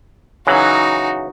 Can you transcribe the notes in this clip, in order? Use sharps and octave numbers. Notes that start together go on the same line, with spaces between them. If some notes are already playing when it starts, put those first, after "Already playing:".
C#3 E3 F#3 D#4 F#4